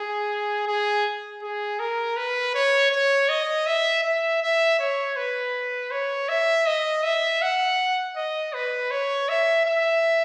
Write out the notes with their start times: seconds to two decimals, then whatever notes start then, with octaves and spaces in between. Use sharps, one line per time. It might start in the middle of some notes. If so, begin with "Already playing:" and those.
Already playing: G#4
0.67 G#4
1.42 G#4
1.79 A#4
2.17 B4
2.55 C#5
2.92 C#5
3.29 D#5
3.66 E5
4.04 E5
4.42 E5
4.79 C#5
5.16 B4
5.91 C#5
6.29 E5
6.66 D#5
7.04 E5
7.42 F#5
8.16 D#5
8.54 B4
8.91 C#5
9.29 E5
9.66 E5